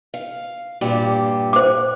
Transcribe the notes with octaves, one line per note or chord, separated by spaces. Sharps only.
F5
G2 A#2 G4
C5 D6